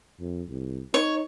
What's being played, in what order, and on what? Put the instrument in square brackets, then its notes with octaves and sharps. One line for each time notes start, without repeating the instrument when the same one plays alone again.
[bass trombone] F2
C2
[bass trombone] D#4 [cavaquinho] C#5